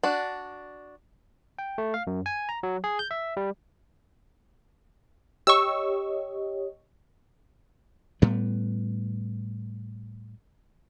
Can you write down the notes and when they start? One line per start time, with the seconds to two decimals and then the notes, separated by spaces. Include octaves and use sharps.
0.03 D4 F#4
1.59 G5
1.78 A3
1.94 F5
2.07 F#2
2.26 G#5
2.49 A#5
2.63 F#3
2.84 G#4
2.99 G6
3.11 E5
3.37 G3
5.47 G4 C#5 D#5 C#6 E6
8.22 A2 G3 B3